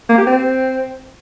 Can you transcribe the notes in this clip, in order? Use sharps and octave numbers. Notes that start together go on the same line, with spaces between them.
A#3
G4
C4